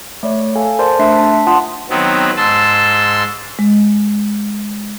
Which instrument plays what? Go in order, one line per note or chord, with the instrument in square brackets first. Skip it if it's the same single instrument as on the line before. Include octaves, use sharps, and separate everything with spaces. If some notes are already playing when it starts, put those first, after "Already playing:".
[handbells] A3 C#5 D5
A4 F5 G#5
A#4 C5 D5 A5 C6
A3 D4 E5 C6 F#6 C7
D4 A5 B6
F4 F#5 A5 C6 D#6
[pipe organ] D#3 F#3 B3 C4
G#2 A5 C6 E6
[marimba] G#3